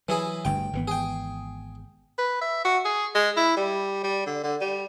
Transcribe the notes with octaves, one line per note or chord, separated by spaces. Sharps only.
E3 F#3 E4 G#4
G1 D2 G2 G5
G#1 E3 B3
G#4 G5
B4
E5
F#4
G#4
G#3
E4
G3
G3
D3
D3
G3